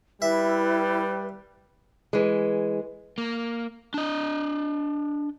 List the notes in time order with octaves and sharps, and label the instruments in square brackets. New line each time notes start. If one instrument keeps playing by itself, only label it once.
[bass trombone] G3 [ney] E4 [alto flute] B4 [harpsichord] E5
[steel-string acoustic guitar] E3 G#3
[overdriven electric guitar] A#3
D4 D#5